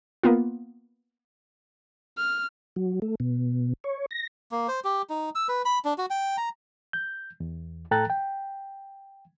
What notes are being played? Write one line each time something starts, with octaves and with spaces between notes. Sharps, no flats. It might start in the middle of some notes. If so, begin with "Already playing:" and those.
A#3 B3 F4
F6
F#3
A3
B2
C#5
A#6
A#3
C5
G4
D#4
E6
B4
B5
D4
F#4
G5
A#5
G6
E2
A2 A4 G5 A#5 F#6 A6
G5